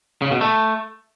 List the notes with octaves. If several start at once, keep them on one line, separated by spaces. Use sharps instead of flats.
C#3
B2
A3